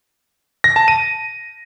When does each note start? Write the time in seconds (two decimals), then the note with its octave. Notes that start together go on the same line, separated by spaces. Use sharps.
0.64 A#6
0.76 A5
0.88 D#7